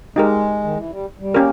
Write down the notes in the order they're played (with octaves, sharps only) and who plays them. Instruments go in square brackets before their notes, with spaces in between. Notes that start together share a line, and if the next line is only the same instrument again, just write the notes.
[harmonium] G#3 [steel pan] D#4 G4 A#4
[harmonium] D#3
E3
G3
G3
[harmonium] A#3 [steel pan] C#4 G4 A#4